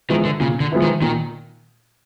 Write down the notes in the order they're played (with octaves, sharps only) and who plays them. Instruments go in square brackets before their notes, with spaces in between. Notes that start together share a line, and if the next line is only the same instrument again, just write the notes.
[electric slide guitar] D#3 [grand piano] F3 G#3 B3 E4
[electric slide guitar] D3
[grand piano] A#2 [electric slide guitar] C#3
[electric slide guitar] D3
[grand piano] F3 G#3 B3 E4
[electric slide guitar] D#3
[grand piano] A#2 [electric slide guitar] D#3